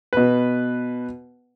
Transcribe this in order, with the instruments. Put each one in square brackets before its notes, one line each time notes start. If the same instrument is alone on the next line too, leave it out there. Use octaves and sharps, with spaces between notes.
[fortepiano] B2 B4